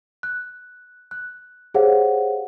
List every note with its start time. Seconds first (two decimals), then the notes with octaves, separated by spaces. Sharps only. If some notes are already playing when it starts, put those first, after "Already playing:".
0.23 F#6
1.11 F#6
1.74 G4 G#4 C5 C#5 F5 F#5